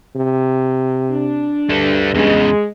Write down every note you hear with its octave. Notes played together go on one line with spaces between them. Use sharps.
C3
D4
G2 D3 A3
E2 C#3 G#3